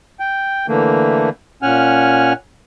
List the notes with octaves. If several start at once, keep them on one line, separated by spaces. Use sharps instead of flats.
G5
D3 E3 A3 A#3
A#2 C#4 F#5 G#5 F6